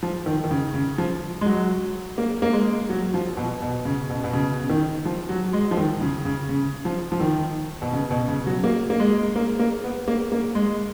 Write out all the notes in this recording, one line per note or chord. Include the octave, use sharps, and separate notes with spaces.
F3
D#3
D#3
C#3
C#3
F3
G#3
F#3
A#3
A#3
G#3
F#3
F3
B2
B2
C#3
B2
B2
C#3
D#3
F3
F#3
G#3
F3
D#3
C#3
C#3
C#3
F3
F3
D#3
B2
C#3
B2
C#3
F#3
A#3
A#3
G#3
A#3
A#3
B3
A#3
A#3
G#3